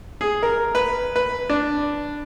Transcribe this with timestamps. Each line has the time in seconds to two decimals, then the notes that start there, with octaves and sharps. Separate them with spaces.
0.21 G#4
0.43 A#4
0.75 B4
1.16 B4
1.50 D4